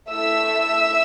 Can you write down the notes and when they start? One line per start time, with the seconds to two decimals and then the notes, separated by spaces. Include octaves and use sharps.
0.11 A3 E4 A4 E5 E6